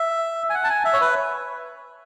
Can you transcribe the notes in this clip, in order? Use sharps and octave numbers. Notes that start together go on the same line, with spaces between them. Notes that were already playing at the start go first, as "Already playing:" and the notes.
Already playing: E5
G#5
F#5
A5
G#5
E5
C#5
B4